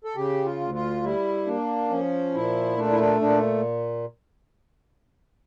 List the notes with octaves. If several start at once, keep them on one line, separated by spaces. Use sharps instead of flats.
A4
C#3 G4
F4
D2
F4
G3 E4
A#3 D4
F3 C#4
A#2 E4
A3 D4
E4
D4
A#2 D4